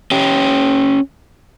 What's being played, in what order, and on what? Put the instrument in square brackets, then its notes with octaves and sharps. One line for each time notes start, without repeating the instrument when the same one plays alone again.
[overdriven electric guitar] C#4 G4